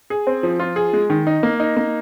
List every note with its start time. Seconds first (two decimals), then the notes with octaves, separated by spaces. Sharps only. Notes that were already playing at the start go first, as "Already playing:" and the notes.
0.10 G#4
0.27 C4
0.43 F3
0.60 F4
0.76 G#4
0.93 G#3
1.10 D#3
1.27 D#4
1.43 A#3
1.60 D#4
1.77 A#3